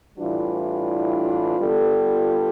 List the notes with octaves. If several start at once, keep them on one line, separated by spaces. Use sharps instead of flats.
A2 E3 G3 D4 F4
D3 G3 B3 F4 A4